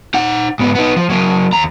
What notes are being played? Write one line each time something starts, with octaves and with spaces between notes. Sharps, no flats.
D#4 F#5
G#2 B3
B3 D#4
F3
F#3 A#3
D#2 A#5